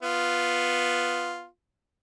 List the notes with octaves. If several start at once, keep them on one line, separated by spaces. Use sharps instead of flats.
B3 F4